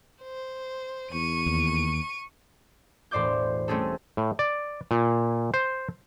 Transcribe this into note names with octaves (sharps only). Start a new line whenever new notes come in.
C5
E2 C#6 D#7
D#2
E1 A2 C5 D5 D6 G6
G3 A3 C4 C#4 G#4 A4
A2
D5
A#2
C5